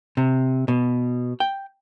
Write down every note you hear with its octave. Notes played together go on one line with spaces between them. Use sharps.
C3
B2
G5